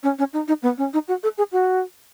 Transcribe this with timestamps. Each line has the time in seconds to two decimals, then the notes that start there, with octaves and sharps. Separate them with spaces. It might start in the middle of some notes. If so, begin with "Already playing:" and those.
0.03 C#4
0.19 C#4
0.33 D#4
0.48 D#4
0.63 B3
0.78 C#4
0.94 D#4
1.08 F#4
1.23 A4
1.38 G#4
1.52 F#4